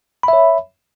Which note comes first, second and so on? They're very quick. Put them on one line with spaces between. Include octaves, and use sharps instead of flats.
B5 E5 C#5